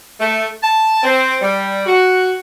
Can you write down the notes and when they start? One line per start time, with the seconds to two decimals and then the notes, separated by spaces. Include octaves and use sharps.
0.20 A3
0.63 A5
1.04 C4
1.42 G3
1.86 F#4